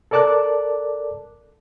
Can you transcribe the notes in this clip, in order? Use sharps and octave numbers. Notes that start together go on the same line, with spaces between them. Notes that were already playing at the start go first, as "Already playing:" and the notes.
A4 A#4 D5 A5 D6 F#6